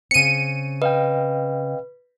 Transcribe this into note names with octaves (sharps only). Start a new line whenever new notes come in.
C#3 C4 C#7 D#7
B4 D#5 F5 G5